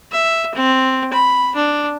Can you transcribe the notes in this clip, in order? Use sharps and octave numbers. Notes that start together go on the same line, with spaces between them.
E5
C4
B5
D4